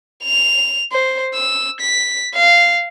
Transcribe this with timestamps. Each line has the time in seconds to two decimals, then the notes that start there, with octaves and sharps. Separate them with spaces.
0.25 F7
0.92 C5
1.34 E6
1.80 B6
2.35 F5